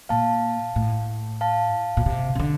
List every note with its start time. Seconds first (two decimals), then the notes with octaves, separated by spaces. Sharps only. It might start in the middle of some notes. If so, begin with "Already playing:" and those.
0.09 A#2 F5 A5
0.76 A2
1.41 F5 A5
1.97 A#2
2.06 C3
2.35 C3
2.39 D3